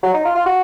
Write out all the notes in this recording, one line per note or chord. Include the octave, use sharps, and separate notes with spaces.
F#3
D#4
F4
F4
F#4